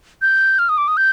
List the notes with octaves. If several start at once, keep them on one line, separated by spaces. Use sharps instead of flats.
G6
F6
D#6
D6
D#6
G6